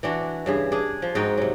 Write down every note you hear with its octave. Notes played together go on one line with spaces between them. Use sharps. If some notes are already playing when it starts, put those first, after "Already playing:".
E3 D4 F#4
G2 C#3 G#4
D4 G#4
F3
G#2 D#4 F#4 G5
C3 F#3